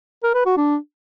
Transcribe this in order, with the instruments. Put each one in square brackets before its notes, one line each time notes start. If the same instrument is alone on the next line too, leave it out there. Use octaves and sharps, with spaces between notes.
[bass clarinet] A#4
B4
F#4
D4